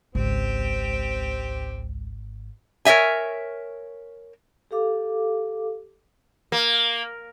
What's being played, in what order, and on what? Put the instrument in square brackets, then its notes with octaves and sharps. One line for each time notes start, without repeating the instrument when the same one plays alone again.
[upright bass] G#1 [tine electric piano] C#2 [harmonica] C4 G4
[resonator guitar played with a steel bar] A#4 C#5 D#5 E5 G#5
[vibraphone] G4 A4 F5 D6
[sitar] A#3